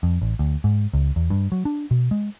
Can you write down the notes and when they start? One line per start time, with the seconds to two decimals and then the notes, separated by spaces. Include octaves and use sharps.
0.03 F2
0.22 A1
0.39 D2
0.64 G#2
0.93 C#2
1.16 E2
1.30 G2
1.52 F#3
1.65 D4
1.91 B2
2.11 G#3